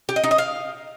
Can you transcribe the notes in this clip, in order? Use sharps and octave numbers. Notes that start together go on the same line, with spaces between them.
G4
D#5
D#4
D#5
F5